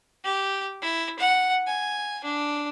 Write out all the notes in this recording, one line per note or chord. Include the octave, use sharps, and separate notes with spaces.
G4
E4
F#5
G#5
D4